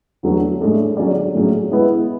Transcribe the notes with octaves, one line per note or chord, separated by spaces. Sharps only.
E2 D3 F#3 A3 D4
A2 G#3 D4 A4
D3 F#3 C#4 G#4 D5
A2 F#3 C#4 G#4
G#3 B3 E4